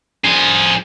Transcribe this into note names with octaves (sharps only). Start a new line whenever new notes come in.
F3 G#4